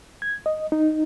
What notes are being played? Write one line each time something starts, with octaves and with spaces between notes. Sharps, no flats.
G#6
D#5
D#4